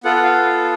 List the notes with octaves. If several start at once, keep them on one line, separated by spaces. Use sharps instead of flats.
B3 F4 A4 F#5
F#5
F5